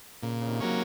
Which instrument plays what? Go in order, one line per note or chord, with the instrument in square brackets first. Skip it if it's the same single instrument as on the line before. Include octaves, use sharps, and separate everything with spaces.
[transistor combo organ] A#2 [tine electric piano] C#3
[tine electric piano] C#3
C3 D#3
[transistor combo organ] F#3 A#3 C#4